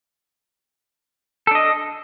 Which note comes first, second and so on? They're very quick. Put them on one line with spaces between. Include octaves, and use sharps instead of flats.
A4 D4 D#5